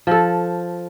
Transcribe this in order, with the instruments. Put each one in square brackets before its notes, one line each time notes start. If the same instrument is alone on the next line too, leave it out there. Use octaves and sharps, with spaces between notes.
[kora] F3 A4